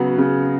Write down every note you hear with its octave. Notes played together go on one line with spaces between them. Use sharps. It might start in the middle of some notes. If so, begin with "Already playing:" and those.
Already playing: C#3 F#3 B3 F#4
C#3